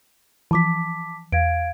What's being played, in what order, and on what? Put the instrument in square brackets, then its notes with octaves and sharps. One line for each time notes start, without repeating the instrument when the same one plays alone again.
[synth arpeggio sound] E3 F3 [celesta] A5 D6 B6
[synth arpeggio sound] E2 [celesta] F5 G#6 D7